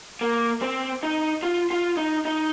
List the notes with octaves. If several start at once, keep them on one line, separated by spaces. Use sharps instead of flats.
A#3
C4
D#4
F4
F4
D#4
D#4